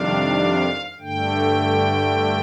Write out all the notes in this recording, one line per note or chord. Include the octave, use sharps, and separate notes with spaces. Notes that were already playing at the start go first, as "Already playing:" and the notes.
Already playing: F2 C3 D#3 G3 D4 F5
G2 D3 A3 G5